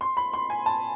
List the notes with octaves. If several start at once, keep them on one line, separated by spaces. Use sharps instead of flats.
C6
B5
C6
G#5
A5